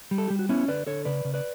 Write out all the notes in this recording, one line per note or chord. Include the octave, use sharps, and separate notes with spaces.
G3
A4
G3 G4
F#4
B3 C#4 E4
D3 B4 D5
D3 A4 C#5
C#3 B4 D5
C#3
B4 D5